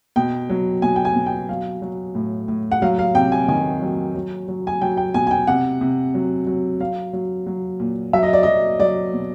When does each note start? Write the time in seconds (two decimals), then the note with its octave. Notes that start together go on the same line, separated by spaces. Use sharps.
0.16 B2 G5
0.50 F#3
0.82 B2 G#5
0.96 G5
1.05 G#5
1.16 B2
1.26 G5
1.49 F#3 F5
1.82 F#3
2.15 A2
2.48 A2
2.72 F#5
2.82 F#3 F5
2.99 F5
3.15 C3 G5
3.32 G#5
3.48 D#3 G#5
3.82 F#3
4.15 F#3
4.48 F#3
4.67 G#5
4.81 F#3 G5
4.97 G5
5.14 B2 G#5
5.27 G#5
5.31 G5
5.47 C3 F#5
5.81 C3
6.14 F#3
6.47 F#3
6.80 F#3 F5
7.13 F#3
7.46 F#3
7.80 A#2
8.13 F#3 E5
8.23 D#5
8.33 D5
8.43 F#3 D#5
8.80 F#3 D5
9.13 B2